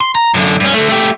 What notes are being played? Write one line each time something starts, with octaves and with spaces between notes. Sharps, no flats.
C6
A#5
F#2 D3
G2 C#4
D3 A3
A3 G4